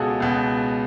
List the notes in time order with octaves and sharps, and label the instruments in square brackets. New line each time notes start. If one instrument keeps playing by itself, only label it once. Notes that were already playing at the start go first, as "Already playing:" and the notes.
Already playing: [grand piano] C#2 B2 F#4 G#4 A4
C#2 B2